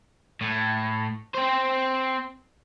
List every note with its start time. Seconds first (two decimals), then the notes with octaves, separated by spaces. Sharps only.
0.41 A2
1.35 C4 C5